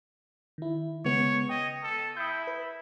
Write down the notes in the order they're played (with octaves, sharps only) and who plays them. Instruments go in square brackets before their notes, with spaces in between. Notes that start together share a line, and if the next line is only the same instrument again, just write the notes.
[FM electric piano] D#3 E4
[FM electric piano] C#3 G#3 B3 [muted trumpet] C#5
[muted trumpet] D#5 [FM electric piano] G5
[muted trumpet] A4
[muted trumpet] E4 [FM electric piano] D#6 G6
[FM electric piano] B4